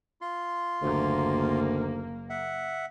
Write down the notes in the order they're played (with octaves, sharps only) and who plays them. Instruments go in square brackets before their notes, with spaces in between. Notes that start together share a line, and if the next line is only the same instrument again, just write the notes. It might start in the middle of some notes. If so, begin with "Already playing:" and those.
[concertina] F4 C6
[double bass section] F#1 A#3 [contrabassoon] D2
[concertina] E5 F#5